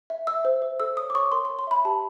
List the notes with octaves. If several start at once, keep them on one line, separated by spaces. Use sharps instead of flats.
E5
E5 E6
C5
C5
A4 E6
C#5 D#6
D6
C#5 C#6
A#4 C6
C6
C#5
C6
E5 B5
G4 A5